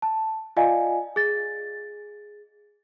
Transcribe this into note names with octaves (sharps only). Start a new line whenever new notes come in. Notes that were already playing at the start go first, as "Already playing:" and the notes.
A5
F4 D5 D#5 F5 G#5
G#4 A6